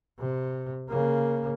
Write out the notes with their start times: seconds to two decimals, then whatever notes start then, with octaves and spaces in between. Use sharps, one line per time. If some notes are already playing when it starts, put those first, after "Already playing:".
0.19 C3
0.89 C#3 A#3